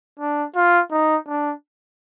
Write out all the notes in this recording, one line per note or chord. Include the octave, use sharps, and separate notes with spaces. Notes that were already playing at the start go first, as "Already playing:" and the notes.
D4
F4
D#4
D4